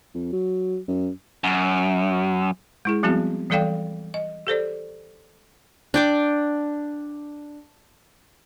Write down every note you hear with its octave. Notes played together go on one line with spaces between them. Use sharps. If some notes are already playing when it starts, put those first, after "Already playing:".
F2
F#3
F#2
F#2
G#3 E4 G#4
F3 G3 B3 C4 F#4 G#4
E3 G3 A4 D5 F5 G5
D#5
G4 A4 C5 D5
D4 G5 D6